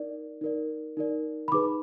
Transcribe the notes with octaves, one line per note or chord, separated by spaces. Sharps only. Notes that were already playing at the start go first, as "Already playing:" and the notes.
Already playing: D#4 A#4 D5
D#4 A#4 D5
D#4 A#4 D5
B5
D#4 G#4 B4 D6